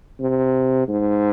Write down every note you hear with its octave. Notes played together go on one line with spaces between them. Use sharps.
C3
G#2